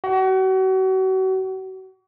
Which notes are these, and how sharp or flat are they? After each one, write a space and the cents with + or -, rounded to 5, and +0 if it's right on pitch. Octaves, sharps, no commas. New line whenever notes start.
F#4 +35